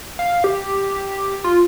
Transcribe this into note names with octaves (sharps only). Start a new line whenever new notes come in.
F5
G4
F4